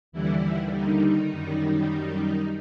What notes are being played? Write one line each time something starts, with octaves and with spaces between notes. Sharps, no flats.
D#2 D3 E3 G3 E4
D#3 D#4
F#2 D#3 G3